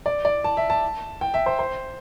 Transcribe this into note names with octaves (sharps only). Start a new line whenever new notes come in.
D5
D5
A5
E5
A5
G5
E5
C5
C5